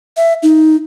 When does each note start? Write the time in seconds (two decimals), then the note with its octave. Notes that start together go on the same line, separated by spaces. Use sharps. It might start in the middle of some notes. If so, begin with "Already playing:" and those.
0.17 E5
0.43 D#4